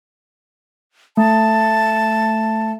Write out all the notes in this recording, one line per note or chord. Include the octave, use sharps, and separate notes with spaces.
A3 A5